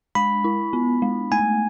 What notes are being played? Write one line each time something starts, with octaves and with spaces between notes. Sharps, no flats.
G#3 B5
E4
B3
G#3
A3 G#5